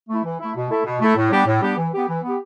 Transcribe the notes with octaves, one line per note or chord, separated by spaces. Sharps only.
A3 E4
E3
A3 E4
B2
A3 E4 A4
B2
A3 E4 A4
A2
G3 B3 D4 G4
A2
G3 B3 D4 G4
E3
B3 G4
E3
B3
G4